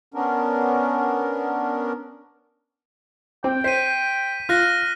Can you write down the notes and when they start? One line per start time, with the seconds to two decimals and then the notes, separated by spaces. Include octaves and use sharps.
0.14 B3 C#4 D4 A#4
3.44 C4 G5
3.64 C5 B6 D#7
4.49 F4 F6 F#6 A#6